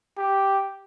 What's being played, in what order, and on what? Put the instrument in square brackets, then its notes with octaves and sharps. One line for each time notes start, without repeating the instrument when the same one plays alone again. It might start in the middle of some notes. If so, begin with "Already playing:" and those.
[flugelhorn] G4